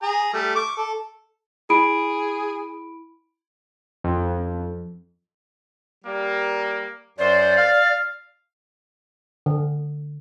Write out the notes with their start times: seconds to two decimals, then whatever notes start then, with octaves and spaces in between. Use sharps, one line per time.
0.02 G#4 A#5
0.33 G3 A3
0.55 C#6 D6
0.77 A4
1.70 E4 G#4 B5 D7
4.04 F2
6.05 G3 A#3
7.18 F#2 C5 D5
7.57 F5
9.46 D3